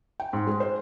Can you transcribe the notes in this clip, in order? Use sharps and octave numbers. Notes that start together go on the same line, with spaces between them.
G5
G#2
G#3
C5